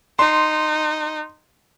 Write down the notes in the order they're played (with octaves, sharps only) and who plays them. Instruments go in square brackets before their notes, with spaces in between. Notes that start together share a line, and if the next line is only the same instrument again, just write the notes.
[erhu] D#4 [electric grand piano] C6